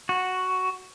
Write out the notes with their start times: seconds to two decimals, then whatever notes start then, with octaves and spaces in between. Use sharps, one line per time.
0.09 F#4